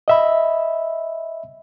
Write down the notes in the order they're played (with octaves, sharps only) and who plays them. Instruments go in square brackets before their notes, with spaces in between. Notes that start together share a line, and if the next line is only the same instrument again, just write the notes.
[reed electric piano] D#5 E5 B5